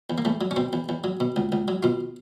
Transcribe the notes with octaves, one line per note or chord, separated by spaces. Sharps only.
E2
A#3
E2 A3
F#3
C#4
B2 C4
E2
E2
F#3
B2
C#2
C#2
F#3
B2 F4